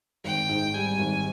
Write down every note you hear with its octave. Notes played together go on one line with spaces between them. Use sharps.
G#1 G5
G#2
G3 G#5
G#1